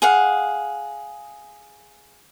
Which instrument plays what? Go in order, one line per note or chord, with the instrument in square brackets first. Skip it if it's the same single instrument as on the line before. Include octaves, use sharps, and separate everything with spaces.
[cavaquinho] G#4 F5 F#5